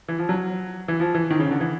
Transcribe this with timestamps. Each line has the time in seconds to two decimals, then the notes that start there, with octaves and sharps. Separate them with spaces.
0.08 E3
0.18 F3
0.29 F#3
0.88 E3
1.00 F3
1.15 E3
1.30 D#3
1.39 C#3
1.51 D3
1.61 E3